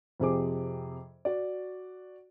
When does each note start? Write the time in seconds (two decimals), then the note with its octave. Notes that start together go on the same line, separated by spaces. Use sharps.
0.20 F2 C3 G#4 D6
1.25 F#4 D5